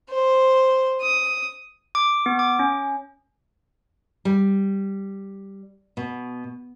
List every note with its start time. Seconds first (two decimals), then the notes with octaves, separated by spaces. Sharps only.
0.11 C5
1.02 D#6
1.95 D6
2.26 B3
2.39 D6
2.59 C#4
4.25 G3
5.97 B2